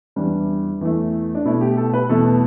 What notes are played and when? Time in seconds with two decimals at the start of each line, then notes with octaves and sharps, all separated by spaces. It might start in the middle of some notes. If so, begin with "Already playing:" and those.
0.16 E2 E3 G3 D4
0.81 E2 E3 A3
1.35 D4
1.45 B2 A3 E4
1.61 G4
1.77 A4
1.93 B4
2.09 E2 B2 A3 A4